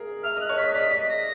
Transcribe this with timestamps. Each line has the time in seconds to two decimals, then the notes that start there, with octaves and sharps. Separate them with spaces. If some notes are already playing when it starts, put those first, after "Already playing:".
Already playing: G#4 A#4
0.23 E5 F6
0.37 D#5 F#6
0.49 C#5
0.57 D#5 B6
0.74 D5 B6
0.82 D#5
0.91 D5 B6
1.09 A#6